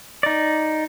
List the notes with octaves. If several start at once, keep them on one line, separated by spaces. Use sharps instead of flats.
D#4 D5